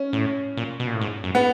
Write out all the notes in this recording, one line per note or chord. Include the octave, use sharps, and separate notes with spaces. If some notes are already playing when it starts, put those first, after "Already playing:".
Already playing: C#4
A2
A#2
B2
A#2
A2
G#2
F#2
B3